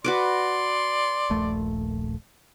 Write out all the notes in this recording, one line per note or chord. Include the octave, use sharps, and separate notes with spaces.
F#4 B4 D5 C6 D6
D#1 A#1 A3